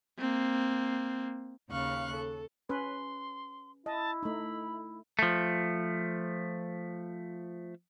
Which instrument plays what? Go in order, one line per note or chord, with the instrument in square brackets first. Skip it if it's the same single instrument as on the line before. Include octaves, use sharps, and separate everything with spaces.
[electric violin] A#3 C4
[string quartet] D#2 C#3 F5 C#6 F#6
A4
[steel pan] C#4 B4 [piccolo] C6
[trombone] E4 [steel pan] D#5 [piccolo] A5
[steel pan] A3 D#4 [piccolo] B5
[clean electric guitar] F3 A3